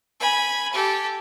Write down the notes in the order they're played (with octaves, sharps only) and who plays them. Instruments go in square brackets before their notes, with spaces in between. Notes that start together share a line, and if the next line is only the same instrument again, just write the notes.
[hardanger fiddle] G#5 B5
G4 A4